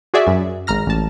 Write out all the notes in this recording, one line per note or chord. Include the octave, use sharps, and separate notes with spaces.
F#4 G#4 D5 E5
F#2
G#1 A#5 F6 A#6
A1 A5